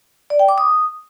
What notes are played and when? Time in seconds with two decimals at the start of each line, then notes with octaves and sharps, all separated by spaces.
0.30 D5
0.39 G5
0.49 D6
0.58 D#6